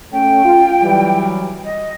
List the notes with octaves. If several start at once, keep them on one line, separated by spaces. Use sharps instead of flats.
A3 C#4 G5
F4
E3 F#3 G3
D#5